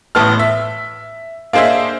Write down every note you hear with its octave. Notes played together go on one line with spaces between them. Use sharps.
A1 A2 B3 A5 F6
E5
A#3 D4 G#4 C5 D#5 E5